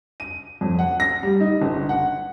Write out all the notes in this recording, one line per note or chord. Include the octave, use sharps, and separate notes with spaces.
D#7
F2
F#5
A#6
G3
D#4
G1
F#5